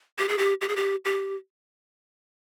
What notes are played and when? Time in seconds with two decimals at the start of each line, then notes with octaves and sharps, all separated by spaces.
0.19 G4
0.28 G#4
0.38 G4
0.61 G4
0.69 G#4
0.76 G4
1.05 G4